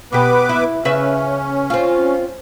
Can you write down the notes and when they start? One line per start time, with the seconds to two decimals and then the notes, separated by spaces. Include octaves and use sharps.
0.13 B2 B3 G4 B4 D6
0.49 E4
0.85 C#3 C#4 B4 E5
1.70 C4 F4